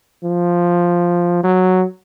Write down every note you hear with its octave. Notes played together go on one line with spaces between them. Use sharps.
F3
F#3